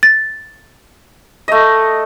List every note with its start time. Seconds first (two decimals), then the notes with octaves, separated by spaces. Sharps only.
0.03 A6
1.48 A3 D#5